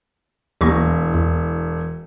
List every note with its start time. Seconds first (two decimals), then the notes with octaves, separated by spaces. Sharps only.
0.61 E1 D#2 C#6 A#6
1.14 E2